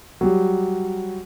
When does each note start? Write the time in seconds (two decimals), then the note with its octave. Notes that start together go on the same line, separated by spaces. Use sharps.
0.21 F#3 G3